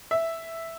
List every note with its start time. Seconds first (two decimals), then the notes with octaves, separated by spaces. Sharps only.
0.11 E5